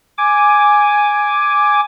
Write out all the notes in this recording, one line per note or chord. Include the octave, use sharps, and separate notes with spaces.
G#5 D6